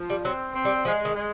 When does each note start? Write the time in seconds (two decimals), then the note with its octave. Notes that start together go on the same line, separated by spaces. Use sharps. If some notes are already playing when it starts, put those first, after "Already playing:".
Already playing: F3
0.10 G3
0.24 F#3 C4
0.55 C4
0.65 G3
0.85 F3 G#3
1.05 D#3
1.16 G#3